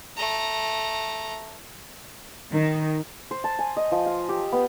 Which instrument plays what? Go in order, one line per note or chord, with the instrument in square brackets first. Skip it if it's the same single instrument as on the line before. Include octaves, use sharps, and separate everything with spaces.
[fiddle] A3 A#5
[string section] D#3
[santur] C5
A5
G#5
D#5
F3
F5
G4
B3